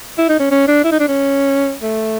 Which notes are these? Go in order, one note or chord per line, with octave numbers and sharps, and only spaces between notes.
E4
D#4
C#4
C#4
D4
E4
D#4
D4
C#4
A3